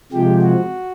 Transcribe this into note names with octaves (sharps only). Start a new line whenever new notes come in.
C3 F3 G#3 G4
F#4